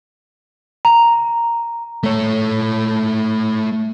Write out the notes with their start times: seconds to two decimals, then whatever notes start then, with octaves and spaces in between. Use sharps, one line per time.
0.85 A#5
2.03 A3 C#5